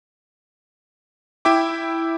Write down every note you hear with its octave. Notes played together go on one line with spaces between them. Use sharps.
E4 E5 G5 D6